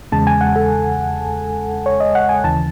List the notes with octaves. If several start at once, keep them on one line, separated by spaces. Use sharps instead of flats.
E2 C#3 G#3 A5
G#5
F#5
A4
C#5
D#5
F#5
G#5
D#2 C#3 E3 A5